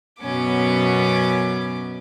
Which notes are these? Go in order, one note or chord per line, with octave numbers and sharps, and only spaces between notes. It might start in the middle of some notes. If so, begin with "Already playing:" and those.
F#2 B2 B3 C#4 D6